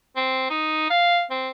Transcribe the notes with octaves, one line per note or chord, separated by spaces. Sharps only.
C4
D#4
F5
C4